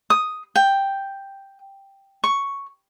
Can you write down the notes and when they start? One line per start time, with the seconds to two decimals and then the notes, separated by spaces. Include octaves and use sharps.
0.10 D#6
0.56 G5
2.24 C#6